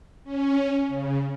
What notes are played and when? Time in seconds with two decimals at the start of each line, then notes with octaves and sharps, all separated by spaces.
0.24 C#4
0.88 C#3